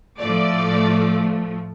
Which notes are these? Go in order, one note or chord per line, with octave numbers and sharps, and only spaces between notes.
A2 F3 A3 D5